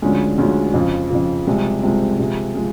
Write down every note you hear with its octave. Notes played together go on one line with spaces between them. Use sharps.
D2 D3 F3 G#3 C#4
D2 D3 F3 G#3 C#4
F2 C#3 F3
F2 C#3 F3
C2 C3 F3 G#3
C2 C3 F3 G#3
C3 F3 G#3
F3 G#3